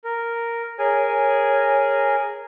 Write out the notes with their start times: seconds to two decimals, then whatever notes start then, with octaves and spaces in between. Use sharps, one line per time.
0.04 A#4
0.79 G#4 A#4 C#5 G#5